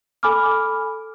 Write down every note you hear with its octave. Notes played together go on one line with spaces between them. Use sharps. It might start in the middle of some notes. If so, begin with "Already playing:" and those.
A4 G#5 B5 D6 F6